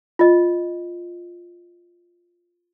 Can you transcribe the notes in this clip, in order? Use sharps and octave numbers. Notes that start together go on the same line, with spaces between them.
F4 D#5